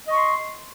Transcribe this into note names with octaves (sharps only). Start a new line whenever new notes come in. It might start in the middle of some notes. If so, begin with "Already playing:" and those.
D#5 C6 C#6